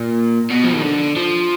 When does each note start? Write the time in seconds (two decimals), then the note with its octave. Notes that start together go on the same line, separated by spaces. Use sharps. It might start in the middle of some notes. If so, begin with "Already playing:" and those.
Already playing: A#2
0.51 B2
0.64 F3
0.74 D#3
0.83 D3
1.16 F3